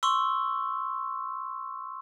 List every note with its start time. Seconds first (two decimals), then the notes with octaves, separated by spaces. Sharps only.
0.03 C6 C#6 E6